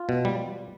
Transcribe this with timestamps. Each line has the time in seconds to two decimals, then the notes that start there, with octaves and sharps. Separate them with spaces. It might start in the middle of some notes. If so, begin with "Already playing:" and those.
Already playing: F4
0.09 B2
0.25 G3